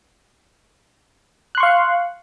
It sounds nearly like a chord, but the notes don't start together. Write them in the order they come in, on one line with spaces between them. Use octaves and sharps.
F#6 C6 C#6 F5